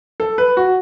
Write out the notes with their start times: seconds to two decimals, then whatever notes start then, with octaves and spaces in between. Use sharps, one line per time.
0.20 A4
0.38 B4
0.57 F#4